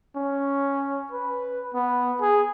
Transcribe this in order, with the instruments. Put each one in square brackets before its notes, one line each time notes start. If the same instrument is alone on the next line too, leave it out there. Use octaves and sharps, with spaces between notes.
[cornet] C#4
B4
B3
G#4